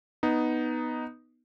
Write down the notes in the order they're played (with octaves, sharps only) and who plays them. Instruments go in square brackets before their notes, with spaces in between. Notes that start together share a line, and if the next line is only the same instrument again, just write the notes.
[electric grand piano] B3 D#4